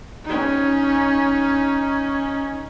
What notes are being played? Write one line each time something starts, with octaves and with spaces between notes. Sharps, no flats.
C#4 D#4